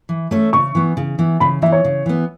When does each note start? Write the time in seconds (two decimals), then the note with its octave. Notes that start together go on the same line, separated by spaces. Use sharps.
0.09 E3
0.31 A3 C#4 A4 C#5
0.53 C#3 C#6
0.75 E3 B3
0.97 C#3
1.19 E3 B3
1.40 C#3 B5
1.62 E3 E5
1.66 B3
1.72 C#5
1.85 C#3
2.06 E3 B3